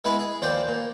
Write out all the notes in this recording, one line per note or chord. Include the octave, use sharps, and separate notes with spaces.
G#3 B3 E4 B4 G#5
G#4
D#2 F3 C5 D5 G5
A#2